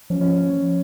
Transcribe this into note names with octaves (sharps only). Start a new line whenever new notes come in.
F3 C#4
C#4